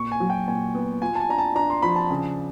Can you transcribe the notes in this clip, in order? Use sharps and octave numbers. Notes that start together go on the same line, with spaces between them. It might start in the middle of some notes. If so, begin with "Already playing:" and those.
Already playing: A#2 C#6
G#5
F#3
G5
A#2 G#5
B3
F4 G#5
A5
G#5
D4 A#5
A5
D4 A#5
C6
F3 B5
A5
C#3